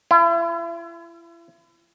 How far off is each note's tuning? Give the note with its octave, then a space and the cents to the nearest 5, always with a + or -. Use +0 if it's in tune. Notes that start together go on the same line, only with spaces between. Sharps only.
E4 +40